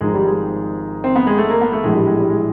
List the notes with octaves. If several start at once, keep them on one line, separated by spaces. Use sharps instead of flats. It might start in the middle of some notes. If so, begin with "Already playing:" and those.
G#1 G#2 F3 G#3
G3
G#3
C4
B3
G#3
A3
A#3
B3
A3
A#1 A2 E3 G#3
G3
G#3
G3
G#3